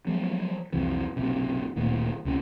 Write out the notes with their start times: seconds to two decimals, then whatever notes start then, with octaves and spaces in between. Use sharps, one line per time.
0.07 F3 F#3 G#3 B3
0.72 C2 F2 C3 E3
1.16 F#1 B1 F#2 C3
1.76 D1 A#2 D#3 A3
2.25 C#2 C3 C#4